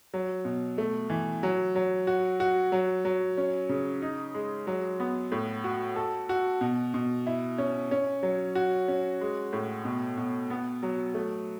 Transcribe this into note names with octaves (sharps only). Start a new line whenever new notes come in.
F#3
B2
A3
E3
F#3
F#3
F#4
F#4
F#3
F#3
C#4
C#3
D#4
G#3
F#3
B3
A2
F#4
A4
F#4
B2
B2
E4
C#4
C#4
F#3
F#4
C#4
G#3
A2
B2
B2
B3
F#3
A3